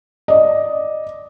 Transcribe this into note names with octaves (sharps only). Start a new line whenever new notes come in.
D5 D#5